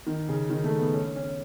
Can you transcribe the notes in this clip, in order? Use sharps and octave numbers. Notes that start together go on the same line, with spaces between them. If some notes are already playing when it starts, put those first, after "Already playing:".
D#3
C#3
D#3
A3
B3
C#4
C#4